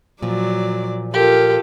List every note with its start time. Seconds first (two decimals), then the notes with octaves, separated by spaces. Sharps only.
0.22 A#2 F3 F#3 D5
1.14 F4 G4 A4 A#4